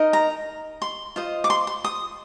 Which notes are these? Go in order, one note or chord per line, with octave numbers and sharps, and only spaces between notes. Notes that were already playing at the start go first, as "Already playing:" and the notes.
Already playing: D#4 A#4 D#5
A#5
C6
F4 C5 D#5
D6
C6
C6
D#6